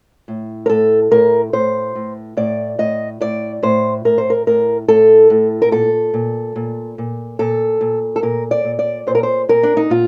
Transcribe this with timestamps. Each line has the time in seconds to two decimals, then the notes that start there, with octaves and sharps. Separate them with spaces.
0.28 A2
0.66 A#4
0.69 A2 A4
1.11 A2 A#4
1.53 A2 C5
1.95 A2
2.37 A2 D5
2.78 A2 D#5
3.21 A2 D5
3.63 A2 C5
4.05 A2 A#4
4.18 C5
4.30 A#4
4.47 A2 A#4
4.88 A2 A4
5.30 A2
5.62 A#4
5.71 A#2 A4
6.14 A#2
6.56 A#2
6.98 A#2
7.39 A#2 A4
7.81 A#2
8.16 A4
8.23 A#2 A#4
8.51 D5
8.64 A#2
8.79 D5
9.07 A#2 C5
9.15 A#4
9.23 C5
9.49 A#2 A#4
9.63 D4
9.77 D#4
9.90 A#2 F4